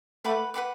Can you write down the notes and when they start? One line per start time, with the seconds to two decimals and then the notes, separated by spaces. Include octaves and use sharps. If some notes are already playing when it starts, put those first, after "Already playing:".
0.24 A3 B4 F#5 B5 D6
0.54 B4 F#5 B5 D6